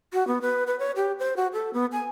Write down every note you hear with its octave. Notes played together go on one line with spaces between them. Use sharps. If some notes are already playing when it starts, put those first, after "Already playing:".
F#4
B3
B4
B4
C#5
G4
C5
F#4
A4
B3
G#5